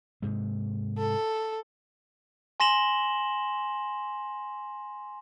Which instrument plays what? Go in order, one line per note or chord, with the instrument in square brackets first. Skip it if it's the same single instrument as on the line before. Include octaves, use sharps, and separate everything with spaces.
[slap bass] G#2 C3 G#3
[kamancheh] A4
[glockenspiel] G#5 C6 A#6 E7 F#7 G7